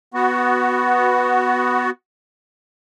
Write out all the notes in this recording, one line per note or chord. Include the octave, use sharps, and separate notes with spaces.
B3 F#4